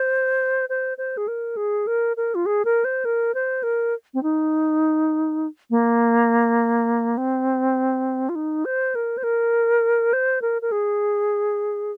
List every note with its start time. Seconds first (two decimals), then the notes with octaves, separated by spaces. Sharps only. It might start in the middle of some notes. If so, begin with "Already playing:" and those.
Already playing: C5
0.69 C5
0.98 C5
1.17 G#4
1.28 A#4
1.57 G#4
1.87 A#4
2.17 A#4
2.35 F4
2.46 G#4
2.65 A#4
2.85 C5
3.05 A#4
3.34 C5
3.63 A#4
4.14 C4
4.23 D#4
5.70 A#3
7.17 C4
8.29 F4
8.35 D#4
8.65 C5
8.95 A#4
9.18 C5
9.23 A#4
10.13 C5
10.42 A#4
10.62 A#4
10.72 G#4